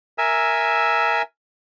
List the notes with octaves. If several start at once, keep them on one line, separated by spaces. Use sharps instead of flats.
A#4 E5 G#5 E6